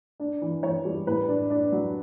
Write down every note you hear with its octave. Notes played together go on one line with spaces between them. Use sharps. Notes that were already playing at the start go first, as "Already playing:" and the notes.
D4
E3
E3 C#5
G3
A2 B4
D4
D4
F#3